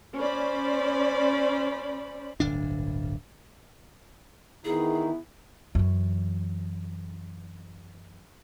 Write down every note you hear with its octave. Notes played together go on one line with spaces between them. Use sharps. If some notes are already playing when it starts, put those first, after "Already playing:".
C#4 C5 D5 B5
D1 G1 D4
E2 D#3 B3 D#4 E4 G#4
F#2 E3